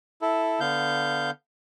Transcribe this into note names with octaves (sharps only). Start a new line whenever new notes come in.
E4 A4
D3 B3 F5 G6